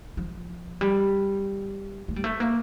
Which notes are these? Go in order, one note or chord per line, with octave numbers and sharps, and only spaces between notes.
F3
G3
A3
G3
A3
A#3